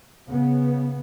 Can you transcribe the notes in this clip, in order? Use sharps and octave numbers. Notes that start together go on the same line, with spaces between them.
C#3 B3